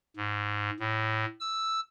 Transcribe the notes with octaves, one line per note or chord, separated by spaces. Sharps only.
G#2
A2
E6